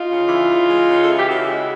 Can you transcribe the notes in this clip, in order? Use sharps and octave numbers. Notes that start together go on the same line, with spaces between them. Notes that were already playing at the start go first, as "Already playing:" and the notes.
Already playing: D#4 F4
C#3
E3
C#3
G#3
C#3
A4
E3 G#4
G4
C#3 E4 F#4
G#3